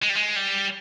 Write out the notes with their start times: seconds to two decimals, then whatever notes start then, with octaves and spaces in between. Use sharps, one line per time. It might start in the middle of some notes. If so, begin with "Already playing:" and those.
0.03 G#3
0.09 G3
0.16 G#3
0.36 G3